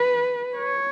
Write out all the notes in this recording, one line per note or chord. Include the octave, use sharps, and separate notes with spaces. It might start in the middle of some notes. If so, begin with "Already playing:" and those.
Already playing: B4
C#5